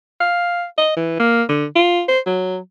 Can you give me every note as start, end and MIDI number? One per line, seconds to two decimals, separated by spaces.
0.21 0.65 77
0.78 0.93 75
0.97 1.16 52
1.20 1.43 58
1.49 1.66 50
1.76 2.03 65
2.08 2.20 72
2.26 2.58 54